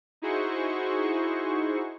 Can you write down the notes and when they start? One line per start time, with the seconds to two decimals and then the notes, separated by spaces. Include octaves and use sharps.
0.22 D#4 E4 F#4 G#4 C5 C#6